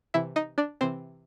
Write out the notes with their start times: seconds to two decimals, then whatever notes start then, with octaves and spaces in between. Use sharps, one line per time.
0.14 C3 E3 E4 E5
0.36 D#4 D#5
0.58 D4 D5
0.81 C3 E3 C4 C5